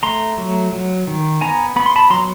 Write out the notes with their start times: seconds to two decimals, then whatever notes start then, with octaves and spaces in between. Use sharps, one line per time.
0.03 A3 A#5 C6
0.38 F#3
0.73 F#3
1.07 D#3
1.41 B3 G#5 A#5
1.76 B3 B5
1.86 C6
1.96 A5 B5
2.10 F#3 A#5 C6